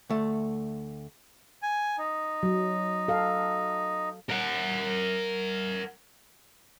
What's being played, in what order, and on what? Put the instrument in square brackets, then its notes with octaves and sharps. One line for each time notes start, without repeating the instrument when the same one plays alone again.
[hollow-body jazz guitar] D2 A3
[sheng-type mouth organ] G#5
D#4
[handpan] F#3
A4 F5
[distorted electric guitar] A#4 F#5